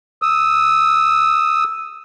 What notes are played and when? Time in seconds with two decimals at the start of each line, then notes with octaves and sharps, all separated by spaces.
0.22 D#6 E6